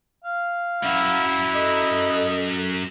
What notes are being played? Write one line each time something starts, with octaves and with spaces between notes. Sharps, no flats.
F5
F#2 F#3 E4 F#5
A4 D#5